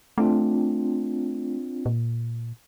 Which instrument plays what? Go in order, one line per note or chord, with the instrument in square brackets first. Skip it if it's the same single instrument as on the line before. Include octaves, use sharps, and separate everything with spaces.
[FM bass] A3 [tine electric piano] C4 D4 F4
[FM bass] A#2